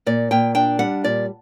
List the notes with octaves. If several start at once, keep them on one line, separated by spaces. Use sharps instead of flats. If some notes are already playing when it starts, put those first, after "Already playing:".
A#2 D5
A#2 G5
D4 G5
G3 F#5
A#2 D5